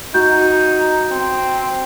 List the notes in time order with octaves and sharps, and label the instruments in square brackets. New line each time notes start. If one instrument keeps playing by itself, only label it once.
[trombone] D#4 [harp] F#4 [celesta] G6
[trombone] C4